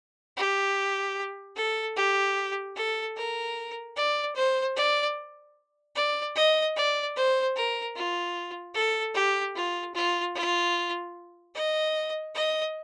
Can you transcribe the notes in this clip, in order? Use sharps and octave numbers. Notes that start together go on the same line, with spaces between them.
G4
A4
G4
A4
A#4
D5
C5
D5
D5
D#5
D5
C5
A#4
F4
A4
G4
F4
F4
F4
D#5
D#5